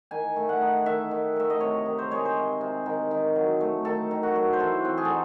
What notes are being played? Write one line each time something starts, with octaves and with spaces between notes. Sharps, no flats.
D#3 G#5
A3
F#5
D#4
D#3 E5
D#3
A3 E5
D#5
C3 C#5
D#3
C5
G#3 C#5
C5
C3
C3
D#3
D#3
F#3
A3
D#3 A4
D#3
F#4
F#3
C5
E3 A4
C4
G#4
D#4 A4